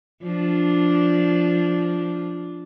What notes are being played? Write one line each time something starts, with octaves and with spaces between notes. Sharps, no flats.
F3 D4